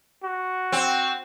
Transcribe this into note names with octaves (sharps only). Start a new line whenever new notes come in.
F#4
C4